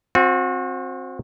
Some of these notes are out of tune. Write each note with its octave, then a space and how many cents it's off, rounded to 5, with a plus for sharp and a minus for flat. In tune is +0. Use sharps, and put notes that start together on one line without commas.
C4 +15 F#4 -35